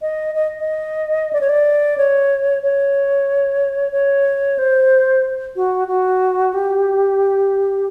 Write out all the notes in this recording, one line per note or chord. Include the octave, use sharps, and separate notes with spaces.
D#5
D#5
D#5
D5
C#5
D5
C#5
C#5
C#5
C5
F#4
F#4
G4